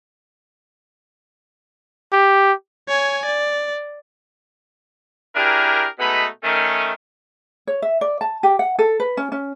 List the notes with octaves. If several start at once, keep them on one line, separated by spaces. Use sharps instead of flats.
G4
C#5 G#5
D5
D4 E4 G4 G#4 A#4
B2 G#3 A3 B3 D#4 B5
D#3 A3 C#4
C#5
E5
D5
A5
G4
F#5
A4
B4
C#4
C#4